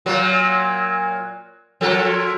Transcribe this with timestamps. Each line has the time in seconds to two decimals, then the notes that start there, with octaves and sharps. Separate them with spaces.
0.06 A#2 F#3 A#3
1.81 F3 A4 A#4